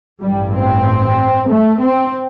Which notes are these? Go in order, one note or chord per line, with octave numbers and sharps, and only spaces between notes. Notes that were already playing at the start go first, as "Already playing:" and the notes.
A1 G2 G3
C4
A3
C4